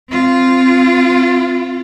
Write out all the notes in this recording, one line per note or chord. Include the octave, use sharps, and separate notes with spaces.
C4 F4